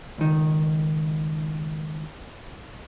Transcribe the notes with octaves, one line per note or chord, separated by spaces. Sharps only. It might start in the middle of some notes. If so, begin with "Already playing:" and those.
C#2 D#3